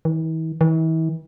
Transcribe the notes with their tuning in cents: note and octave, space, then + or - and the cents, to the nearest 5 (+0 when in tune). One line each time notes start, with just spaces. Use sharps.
E3 -45
E3 -40